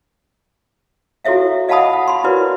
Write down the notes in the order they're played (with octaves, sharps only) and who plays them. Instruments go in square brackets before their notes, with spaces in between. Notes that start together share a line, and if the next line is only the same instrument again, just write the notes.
[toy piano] E4 F#4 A4 C#5 E5 F5
D#5 F5 F#5 A5 B5 D#6
F#5
B5 C6
E4 F#4 A#4 B4 C#5 D5